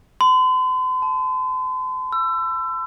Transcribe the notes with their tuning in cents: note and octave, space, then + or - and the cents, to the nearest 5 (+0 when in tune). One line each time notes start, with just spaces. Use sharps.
C6 -45
A5 -5
E6 +25